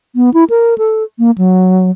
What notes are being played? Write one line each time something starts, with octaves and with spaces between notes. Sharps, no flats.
B3
E4
A#4
A4
A#3
F#3